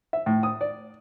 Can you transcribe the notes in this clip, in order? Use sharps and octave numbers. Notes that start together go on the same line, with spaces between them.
E5
A2
D#6
D5